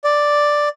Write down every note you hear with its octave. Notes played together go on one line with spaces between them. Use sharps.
D5